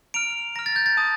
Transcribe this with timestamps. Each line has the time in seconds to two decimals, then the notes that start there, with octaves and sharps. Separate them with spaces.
0.14 A#5 F6 D7 F7
0.56 A#5 F6 A#6
0.66 A6
0.76 G6
0.86 A6
0.97 A5 D#6 G6